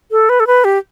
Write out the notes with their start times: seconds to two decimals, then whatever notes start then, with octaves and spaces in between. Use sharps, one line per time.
0.11 A4
0.29 B4
0.40 A4
0.47 B4
0.64 G4